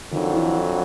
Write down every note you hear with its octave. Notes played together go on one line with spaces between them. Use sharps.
F2 D3 D#3 F#3
E3